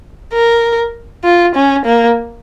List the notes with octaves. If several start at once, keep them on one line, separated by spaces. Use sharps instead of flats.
A#4
F4
C#4
A#3